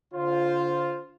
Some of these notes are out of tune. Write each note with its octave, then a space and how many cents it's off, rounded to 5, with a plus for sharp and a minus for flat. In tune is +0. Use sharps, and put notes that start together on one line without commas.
D3 -35 F4 +0 C5 +0